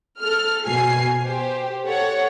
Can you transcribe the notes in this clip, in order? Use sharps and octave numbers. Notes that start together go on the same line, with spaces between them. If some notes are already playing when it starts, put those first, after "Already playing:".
A4 F6
B2 F#4 G#5 C7
G4 C5
A4 C#5 F#5